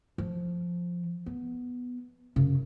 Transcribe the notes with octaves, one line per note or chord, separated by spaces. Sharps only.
F3
B3
F#2 C#3